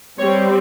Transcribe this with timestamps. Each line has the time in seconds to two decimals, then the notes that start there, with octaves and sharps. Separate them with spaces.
0.18 G3 C4 C#5